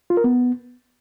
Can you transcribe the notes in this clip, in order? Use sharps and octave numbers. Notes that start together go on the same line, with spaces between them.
F4
A#4
B3